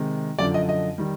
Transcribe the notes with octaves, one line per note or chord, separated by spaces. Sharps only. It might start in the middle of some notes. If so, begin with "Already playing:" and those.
Already playing: C3 D#3 G#3
F#2 D3 F3 D5
D#5
D#5
D#3 G3